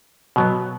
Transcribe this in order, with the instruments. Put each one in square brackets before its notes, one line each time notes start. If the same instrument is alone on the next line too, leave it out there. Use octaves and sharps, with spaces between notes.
[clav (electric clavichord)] B2 F#3 B3